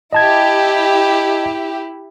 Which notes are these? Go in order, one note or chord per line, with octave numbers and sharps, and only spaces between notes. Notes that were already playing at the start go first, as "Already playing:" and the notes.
E4 G4 D#5 A5 G#6